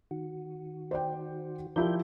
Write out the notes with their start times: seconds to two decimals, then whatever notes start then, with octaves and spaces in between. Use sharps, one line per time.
0.11 D#3 F#4
0.91 C5 D5 G5
1.76 F3 E4 G4 A#4 D5 G6